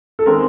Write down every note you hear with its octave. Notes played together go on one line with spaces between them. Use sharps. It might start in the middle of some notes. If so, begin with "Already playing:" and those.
A4
D#3 G#3 C4 A#4